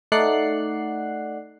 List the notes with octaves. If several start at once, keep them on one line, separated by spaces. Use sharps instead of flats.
A3 D#4 D5 F#5 F#6 C7